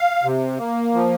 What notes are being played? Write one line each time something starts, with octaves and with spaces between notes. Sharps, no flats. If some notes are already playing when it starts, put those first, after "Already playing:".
Already playing: F5
C3
A#3
F3